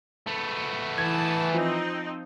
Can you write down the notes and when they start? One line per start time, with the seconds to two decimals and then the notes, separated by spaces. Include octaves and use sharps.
0.27 A3 B3
0.98 E3 A5 G#6
1.54 F3 C4 D#4